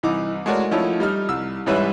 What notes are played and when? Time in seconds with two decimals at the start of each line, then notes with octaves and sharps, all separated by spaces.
0.03 C2 E3 D#4 D6
0.46 G#3 A3 F#4 A#4 C#5 D5
0.71 F3 A3 C#4 D#4 E4
1.00 G3 D#4 F6
1.29 C2 E6
1.66 G#2 E3 G3 C#4 B4 E5